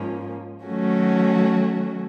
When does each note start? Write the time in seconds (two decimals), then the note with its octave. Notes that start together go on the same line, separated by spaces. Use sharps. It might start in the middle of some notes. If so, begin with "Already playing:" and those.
Already playing: G#2 F3 A#3 C#4
0.65 D#3 F#3 A3 C#4 F#4